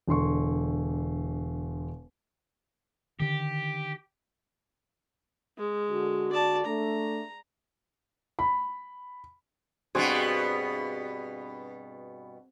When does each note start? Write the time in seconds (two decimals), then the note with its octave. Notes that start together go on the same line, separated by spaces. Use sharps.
0.08 E1 D3 C6 C#6
3.20 D3 D#3 G4
5.58 G#3
5.90 D3 F#4
6.32 D5 A5
6.65 A3 D4 A#5
8.39 B5
9.95 G2 B2 B3 C4 F#4 G#4